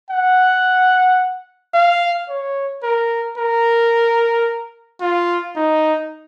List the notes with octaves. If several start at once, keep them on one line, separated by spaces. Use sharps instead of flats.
F#5
F5
C#5
A#4
A#4
F4
D#4